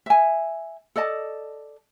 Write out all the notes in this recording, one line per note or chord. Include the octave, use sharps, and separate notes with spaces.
E5 G#5
A4 D5 D#5 A5